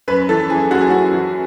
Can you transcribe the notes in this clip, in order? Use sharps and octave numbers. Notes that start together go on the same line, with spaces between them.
F#2 B4
E3 A4
E3 G#4
F#2 F#4
G#4
F#2 F#4
E3